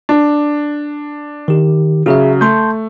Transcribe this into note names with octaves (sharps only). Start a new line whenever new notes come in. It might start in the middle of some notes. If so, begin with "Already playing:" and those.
D4
D#3 G4
C#3 F#3 F#4 G#4 E5
A3 A5 C6 G6